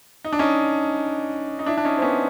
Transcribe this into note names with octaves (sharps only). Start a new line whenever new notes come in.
D#4
D4
C#4 D#4
D#4
D4 E4
D4
C#4 D#4
C4
B3 C#4